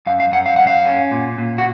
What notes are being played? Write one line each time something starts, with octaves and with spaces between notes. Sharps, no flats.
F#2 F5
F5
F#2 F#5
F5
F#2 F#5
F5
C#4
A#2
A#2
F#4